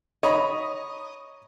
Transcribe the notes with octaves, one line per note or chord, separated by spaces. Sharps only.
C#5 D#5 A#5 B5